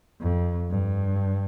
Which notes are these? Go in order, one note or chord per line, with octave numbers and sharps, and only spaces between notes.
F2
G2